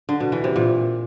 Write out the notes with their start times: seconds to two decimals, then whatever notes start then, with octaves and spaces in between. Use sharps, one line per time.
0.09 D3
0.20 B2
0.32 E3
0.44 C3
0.56 A#2